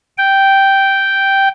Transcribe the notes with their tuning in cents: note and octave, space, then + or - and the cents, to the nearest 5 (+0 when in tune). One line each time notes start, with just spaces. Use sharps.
G5 -5